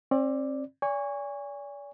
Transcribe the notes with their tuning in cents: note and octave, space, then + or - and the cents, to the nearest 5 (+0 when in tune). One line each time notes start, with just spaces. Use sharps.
C4 +40 D5 +0
D5 -40 G#5 -25 C#6 +0